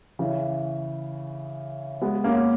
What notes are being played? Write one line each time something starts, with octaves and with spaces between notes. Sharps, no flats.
C#3 E3
G#3 B3
A#3 C#4